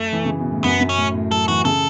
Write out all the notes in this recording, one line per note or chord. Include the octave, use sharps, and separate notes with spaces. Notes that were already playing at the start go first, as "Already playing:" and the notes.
Already playing: F#2 A3
E3
C#3
B2
A2
F#2 B3
F#2
C#4
A2
A2
F#3 A4
E3 F#4
C#3 A4